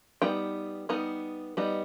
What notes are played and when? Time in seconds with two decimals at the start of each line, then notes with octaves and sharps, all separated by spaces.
0.22 G3 B3 D#4 G5
0.89 G3 B3 D#4
1.57 G3 B3 D#4